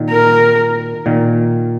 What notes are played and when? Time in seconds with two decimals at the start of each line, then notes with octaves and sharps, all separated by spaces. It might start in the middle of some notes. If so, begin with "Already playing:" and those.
Already playing: A#2 D#3
0.10 A#4
1.06 A#2 D#3